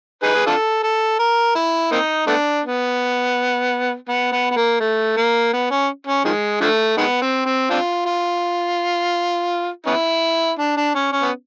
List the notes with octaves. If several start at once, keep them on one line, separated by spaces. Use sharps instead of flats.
D#4 G#4 B4
G#4
D4 F4 A4
A4
A#4
E4
A#3 C4 D#4
A3 B3 D4
B3
B3
B3
B3
A#3
A3
A#3
B3
C#4
C#4
D#3 F3 G#3
D3 F3 A3
D#3 G#3 B3
C4
C4
C4 D4 F4
F4
B3 C#4 E4
D4
D4
C#4
C#4
B3